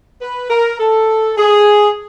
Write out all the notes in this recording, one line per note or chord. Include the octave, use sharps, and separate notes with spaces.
B4
A#4
A4
G#4